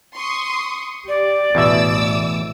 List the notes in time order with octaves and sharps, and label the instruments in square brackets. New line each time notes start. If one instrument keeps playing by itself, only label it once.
[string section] C6 C#6 D#6
[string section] G4 [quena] D5
[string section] A1 D6 E6 [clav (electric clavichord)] E2 B2 E5